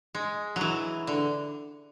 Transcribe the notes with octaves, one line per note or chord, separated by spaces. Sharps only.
G#3
F#3
E3
D3